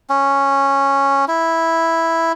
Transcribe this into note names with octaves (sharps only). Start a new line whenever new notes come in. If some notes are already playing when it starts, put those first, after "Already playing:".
C#4
E4